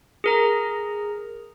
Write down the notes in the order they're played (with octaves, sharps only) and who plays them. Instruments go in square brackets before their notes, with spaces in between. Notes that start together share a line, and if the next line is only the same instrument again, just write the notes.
[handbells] G#4 A#4 A#5